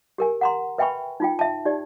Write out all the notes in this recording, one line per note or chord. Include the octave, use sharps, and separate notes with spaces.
G4 A#4 G#5
F#5 A#5 C6
B4 E5 G5 G#5 B5 C#6
D#4 F4 G5
E5 A5
D#4 G4 D5